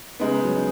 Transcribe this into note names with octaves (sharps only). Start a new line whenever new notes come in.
C#3 G#3 B3 D#4
D#4
F#3
D#4